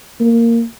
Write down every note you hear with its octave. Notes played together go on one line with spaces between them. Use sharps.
A#3